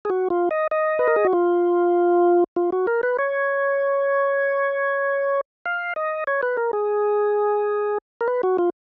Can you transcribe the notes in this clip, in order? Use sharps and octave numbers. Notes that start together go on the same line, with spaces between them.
G#4
F#4
F4
D#5
D#5
B4
A#4
G#4
F#4
F4
F4
F#4
A#4
B4
C#5
F5
D#5
C#5
B4
A#4
G#4
A#4
B4
F#4
F4